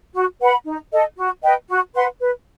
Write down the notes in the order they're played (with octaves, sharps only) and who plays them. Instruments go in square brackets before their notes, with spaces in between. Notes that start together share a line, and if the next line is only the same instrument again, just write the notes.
[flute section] F#4
B4 F#5 B5
D#4
A4 D#5
F#4
B4 D#5 G5
F#4
B4 F#5 C6
B4